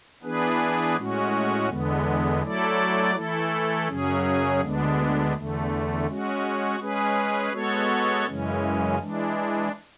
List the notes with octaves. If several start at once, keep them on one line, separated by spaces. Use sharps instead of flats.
E3 B3 D4 G#4 B4
A2 G#3 C#4 F#4
E2 D3 G#3 B3
F#3 A3 E4 A4 D5
E3 A3 E4 A4
F#2 C#3 F#3 C#4 G#4
D2 D3 G#3 B3 D4
E2 D3 A3
G#3 C#4 F#4
G#3 C#4 G#4 B4
G#3 B3 F#4 A4 C#5
F#2 C#3 E3 G#3 C#4
E3 G#3 D4